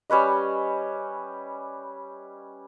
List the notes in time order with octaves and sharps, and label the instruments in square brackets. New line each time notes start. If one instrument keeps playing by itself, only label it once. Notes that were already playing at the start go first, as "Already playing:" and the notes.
[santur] G3 C#4 B4 D#5